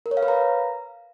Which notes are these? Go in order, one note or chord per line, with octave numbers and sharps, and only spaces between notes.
A#4
C#5
F5
B4
A#5